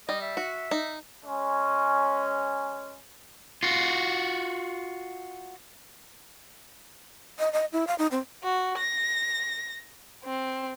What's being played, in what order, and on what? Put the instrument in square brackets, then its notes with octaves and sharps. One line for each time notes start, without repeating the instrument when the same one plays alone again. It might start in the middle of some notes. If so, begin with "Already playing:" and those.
[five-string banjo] G3 [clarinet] D#5
[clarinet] E5
[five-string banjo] F#4
D#4
[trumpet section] G#3 C#4
[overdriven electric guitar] F4 F#4
[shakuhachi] D#5
D#5
E4
F5
D#4
C4
[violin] F#4
A#6
C4